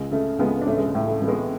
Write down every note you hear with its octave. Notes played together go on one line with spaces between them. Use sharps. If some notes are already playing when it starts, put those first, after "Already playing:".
Already playing: C#2 G#3
C#3 A3
C#2 G#3 B3
D4
A1 A3 C#4
G#3
A3
A2
A3
A1 A3
G#3 B3